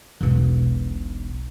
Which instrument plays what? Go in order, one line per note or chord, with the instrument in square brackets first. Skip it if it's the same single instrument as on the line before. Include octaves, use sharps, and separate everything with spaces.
[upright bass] E1 B1